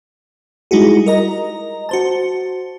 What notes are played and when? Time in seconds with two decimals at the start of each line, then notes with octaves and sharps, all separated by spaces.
0.71 G3 G#3 D#4 E4 F#4 G#4
1.06 A#4 D#5 A#5
1.89 F#4 C5 A5